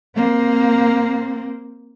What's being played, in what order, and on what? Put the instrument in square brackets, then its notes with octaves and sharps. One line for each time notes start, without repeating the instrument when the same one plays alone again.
[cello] A#3 C4